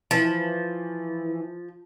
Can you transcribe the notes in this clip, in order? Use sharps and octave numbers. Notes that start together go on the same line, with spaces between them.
E3 F3